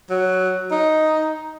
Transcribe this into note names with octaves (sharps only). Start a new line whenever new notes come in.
F#3
D#4